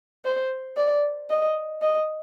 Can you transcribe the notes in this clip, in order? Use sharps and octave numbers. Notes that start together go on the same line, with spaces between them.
C5
D5
D#5
D#5